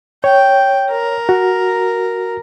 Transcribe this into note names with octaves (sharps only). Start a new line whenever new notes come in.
C#5 G5
A#4
F#4